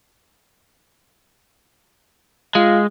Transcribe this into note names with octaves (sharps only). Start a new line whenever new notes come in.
G#3 F4